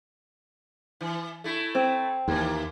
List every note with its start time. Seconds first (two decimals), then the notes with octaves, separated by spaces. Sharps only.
1.01 E3
1.44 A3 E4
1.75 C4
2.28 D#2 E3 A#3